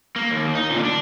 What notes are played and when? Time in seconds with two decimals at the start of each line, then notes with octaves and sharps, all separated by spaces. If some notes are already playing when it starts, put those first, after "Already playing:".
0.16 A#3
0.30 D#2
0.55 D#4
0.70 A#2 D3
0.85 D4